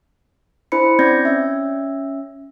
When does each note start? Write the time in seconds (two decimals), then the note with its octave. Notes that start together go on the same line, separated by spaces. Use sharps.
0.72 D4 E4 C5 B5 C#7
0.99 C4 C#4 D5 G6 G#6 A#6
1.25 C#4 E5